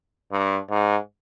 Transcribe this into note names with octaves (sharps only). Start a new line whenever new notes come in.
G2
G#2